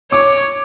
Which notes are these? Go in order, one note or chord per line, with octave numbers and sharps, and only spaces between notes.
C#5 D6